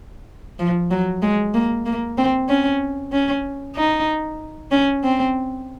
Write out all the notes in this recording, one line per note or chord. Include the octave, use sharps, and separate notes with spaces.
F3
F#3
G#3
A#3
A#3
C4
C#4
C#4
D#4
C#4
C4